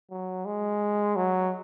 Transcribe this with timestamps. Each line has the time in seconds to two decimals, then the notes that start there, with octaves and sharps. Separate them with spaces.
0.11 F#3
0.45 G#3
1.16 F#3